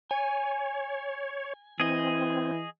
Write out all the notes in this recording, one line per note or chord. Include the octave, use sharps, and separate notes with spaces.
C#5 G#5
E3 C4 G#4 D#5